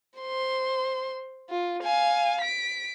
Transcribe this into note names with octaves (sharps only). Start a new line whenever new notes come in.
C5 C6
F4
F5 G#5
B6 D7